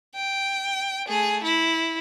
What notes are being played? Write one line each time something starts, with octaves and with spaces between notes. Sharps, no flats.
G5
A3 G#4
E4